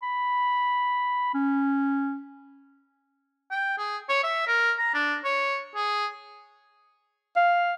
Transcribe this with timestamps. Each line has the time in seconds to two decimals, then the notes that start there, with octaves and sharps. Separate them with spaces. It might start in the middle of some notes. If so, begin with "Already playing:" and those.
0.03 B5
1.34 C#4
3.51 G5
3.78 G#4
4.09 C#5
4.24 E5
4.47 A#4
4.79 A#5
4.94 D4
5.25 C#5
5.76 G#4
7.36 F5